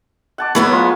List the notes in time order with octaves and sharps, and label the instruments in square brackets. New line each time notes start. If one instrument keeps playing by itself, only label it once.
[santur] F#5 A5 D6
[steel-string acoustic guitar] F#3 B3 A#4 [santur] E4 C#5
[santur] G#3 F4